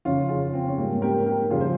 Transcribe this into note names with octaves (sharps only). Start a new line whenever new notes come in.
F2 C#3 F3 C#4 F4
F4 G#4
C4
C#4
G#2 G3 A#3 C4
G4 A#4
G4 A#4
F2 C#3 G3 F4 G#4
C5